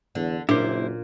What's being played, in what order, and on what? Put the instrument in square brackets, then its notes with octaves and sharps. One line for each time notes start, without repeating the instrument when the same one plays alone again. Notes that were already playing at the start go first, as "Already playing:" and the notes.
[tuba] E2 [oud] D3
[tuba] F#1 [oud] A#2 [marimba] D4 [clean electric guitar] E4 C5